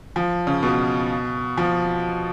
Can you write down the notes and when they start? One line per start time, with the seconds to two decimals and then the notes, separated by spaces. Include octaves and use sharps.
0.16 F3
0.47 C#3
0.63 B2
1.58 F3